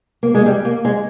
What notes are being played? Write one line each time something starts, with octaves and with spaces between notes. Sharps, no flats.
A#3
G#3
G3
A#3
G#3